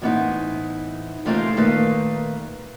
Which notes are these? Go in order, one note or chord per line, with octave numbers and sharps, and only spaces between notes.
A2 E3 B3 C4 D#4 E4
C3 E3 A3 C4 D#4 F4
A#2 D#3 A3 B4 F5